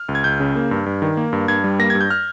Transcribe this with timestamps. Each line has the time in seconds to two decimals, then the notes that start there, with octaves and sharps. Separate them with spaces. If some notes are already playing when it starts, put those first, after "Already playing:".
Already playing: F6
0.09 C#2
0.15 G#6
0.24 C#2 G6
0.40 C#3
0.56 A#3
0.71 G2
0.86 G2
1.02 D#3
1.17 A#3
1.33 G2
1.48 G2 G#6
1.64 G3
1.79 A#3 A#6
1.90 G2 G#6
2.01 G6
2.10 F6